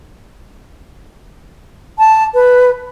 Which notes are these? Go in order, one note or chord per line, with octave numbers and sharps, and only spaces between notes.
A5
B4